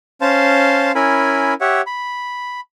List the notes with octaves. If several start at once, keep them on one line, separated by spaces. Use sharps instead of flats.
C#4 C5 F5 A5 C6
C#4 E4 A#4 G#5 B5
G4 C#5 E5 F#5
B5